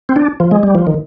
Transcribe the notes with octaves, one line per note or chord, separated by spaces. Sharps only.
C4
D4
F3
G#3
G3
F3
D#3